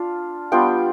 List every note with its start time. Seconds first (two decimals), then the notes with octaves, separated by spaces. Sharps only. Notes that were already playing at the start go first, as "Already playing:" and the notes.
Already playing: D4 F4 F5
0.52 G3 B3 D4 F4 G5